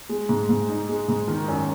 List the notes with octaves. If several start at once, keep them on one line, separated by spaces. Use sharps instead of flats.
G#3
G#2
G#2
D#4
G#3
G#2
D#3
F#2